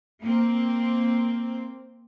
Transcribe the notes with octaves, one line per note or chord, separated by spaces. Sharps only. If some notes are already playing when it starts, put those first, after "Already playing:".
A#3 C4